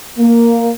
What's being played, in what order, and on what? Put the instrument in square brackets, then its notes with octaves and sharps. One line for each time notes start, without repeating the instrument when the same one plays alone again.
[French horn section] A#3